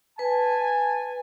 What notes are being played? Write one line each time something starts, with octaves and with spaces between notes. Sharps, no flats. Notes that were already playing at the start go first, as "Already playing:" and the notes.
B4 G#5 A5